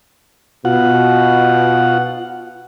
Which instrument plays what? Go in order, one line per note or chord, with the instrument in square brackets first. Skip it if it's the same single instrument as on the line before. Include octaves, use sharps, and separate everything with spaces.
[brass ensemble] B2 [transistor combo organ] F4 F#5